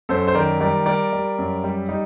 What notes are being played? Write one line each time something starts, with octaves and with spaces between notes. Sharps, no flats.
F#2 A4 C5
C5
D#3 A#4 D5
G3 A#4 D5
G3 A#4 D5
G3
F#2
G3
G3 D#4